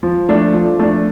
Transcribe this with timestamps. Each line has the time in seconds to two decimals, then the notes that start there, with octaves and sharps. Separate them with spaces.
0.03 F3
0.29 A3 D4
0.54 F3
0.79 A3 D4